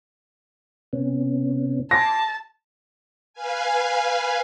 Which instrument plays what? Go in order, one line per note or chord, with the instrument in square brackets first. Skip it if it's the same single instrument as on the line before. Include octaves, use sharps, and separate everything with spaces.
[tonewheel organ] C3 B3 C#4
[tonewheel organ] G#5 C6 D6 [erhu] A5 [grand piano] A#6
[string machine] B4 F5 G#5